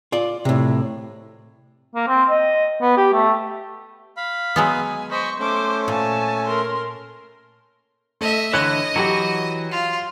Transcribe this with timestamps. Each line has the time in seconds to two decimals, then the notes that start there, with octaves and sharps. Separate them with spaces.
0.12 F4 D5
0.45 A2 C3
1.95 A#3
2.08 C4
2.30 D#5
2.81 B3
2.97 G4
3.13 A3
4.17 F5 B5
4.56 F#3 G#3 B3 G#5
5.11 C5 D#5 B5 C#6
5.39 A3 C#4 C5 D6
5.88 A#2 G#5 A5
6.46 A#4 C6
8.21 A3 D#5 E5
8.53 D3 E3 C#5 D#5 F#6 C#7
8.96 E3 F#3 F#4 G4
9.71 F4